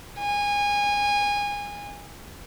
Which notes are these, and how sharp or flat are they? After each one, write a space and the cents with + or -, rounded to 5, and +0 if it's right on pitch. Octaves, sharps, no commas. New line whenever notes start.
G#5 -25